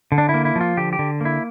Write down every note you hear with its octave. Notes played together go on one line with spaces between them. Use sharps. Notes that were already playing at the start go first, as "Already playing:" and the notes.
D3
D4
E4
A#3
E4
F3
F4
D3 G4
G4
D3
A#3 E4